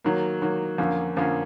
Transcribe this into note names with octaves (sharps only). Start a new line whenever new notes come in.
D#3 F#3 A#3
D#3 F#3 A#3
F2 D3 F3 A#3 C#4
F2 D3 F3 A#3 C#4